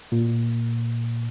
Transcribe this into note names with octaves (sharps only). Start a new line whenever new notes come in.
A#2